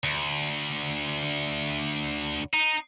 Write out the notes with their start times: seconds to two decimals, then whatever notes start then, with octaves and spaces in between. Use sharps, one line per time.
0.03 D2
2.54 D#4